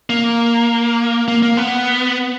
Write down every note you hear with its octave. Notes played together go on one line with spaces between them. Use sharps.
A#3
A#3
A#3
B3